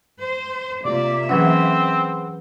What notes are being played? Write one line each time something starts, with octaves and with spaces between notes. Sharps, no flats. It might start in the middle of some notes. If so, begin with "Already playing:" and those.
C5
C3 A#3 F4 D5 E5
E3 F#3 C4 C#4 G#4 B4 F#5